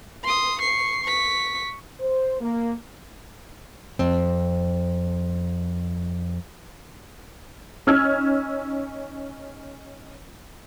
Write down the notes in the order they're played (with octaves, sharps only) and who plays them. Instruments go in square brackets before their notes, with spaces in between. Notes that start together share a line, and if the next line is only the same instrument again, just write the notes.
[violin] C6 D#6
C#6 C7
C#6 B6
[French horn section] C5
A#3
[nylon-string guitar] F2 C4
[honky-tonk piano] C#4 D#4 E6 F6 G#6